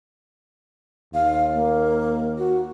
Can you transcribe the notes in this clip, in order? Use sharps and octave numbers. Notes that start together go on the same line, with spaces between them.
D#2 F5
A#3
F#4